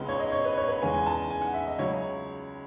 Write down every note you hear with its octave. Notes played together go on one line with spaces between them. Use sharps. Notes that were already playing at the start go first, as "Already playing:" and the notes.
Already playing: C#2 C#3 G#3 B3
C#5
D#5
C#5
B4
C#5
B4
E2 C#3 G#3 B3 G#5
G#5
A5
G#5
F#5
E5
D#5
C#2 C#3 F#3 C#5